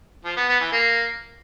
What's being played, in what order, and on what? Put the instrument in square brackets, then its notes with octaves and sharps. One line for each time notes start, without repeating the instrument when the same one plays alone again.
[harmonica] F3
B3
B3
E3
A#3